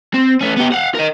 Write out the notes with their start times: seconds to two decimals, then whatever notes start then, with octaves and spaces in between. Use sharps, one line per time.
0.14 C4
0.41 A3 C#4
0.57 B3 G4
0.72 F5 F#5
0.94 A#4 D#5